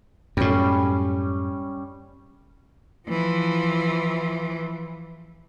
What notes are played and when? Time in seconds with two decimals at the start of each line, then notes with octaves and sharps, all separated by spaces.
0.37 F#2 A2 G3 C#4
3.08 E3 F3